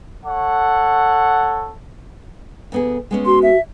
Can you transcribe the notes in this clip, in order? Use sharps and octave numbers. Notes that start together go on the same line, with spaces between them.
A4 C#5 F#5
D2 B3 G#4
G#3 B3 C#4
F#4 C6
E5